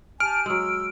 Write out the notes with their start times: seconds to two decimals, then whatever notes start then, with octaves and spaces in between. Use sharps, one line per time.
0.20 G4 G#5 A5 F6 D7
0.46 F#3 G#3 E6